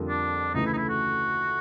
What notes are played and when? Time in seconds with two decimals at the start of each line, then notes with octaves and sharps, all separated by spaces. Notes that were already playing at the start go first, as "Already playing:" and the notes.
Already playing: F2 D3 G3 A#3
0.09 D4
0.54 D2 C#3 E3 A3 D#4
0.66 E4
0.73 D#4
0.77 E4
0.89 F#4